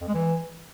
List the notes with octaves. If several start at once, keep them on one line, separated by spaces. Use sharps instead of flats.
F2
G#3
E3